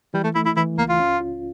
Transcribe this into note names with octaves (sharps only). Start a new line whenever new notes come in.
E3 G3
A3
A3 E4
E4
E3 E4
C#2 A#3
F4
C#4
F4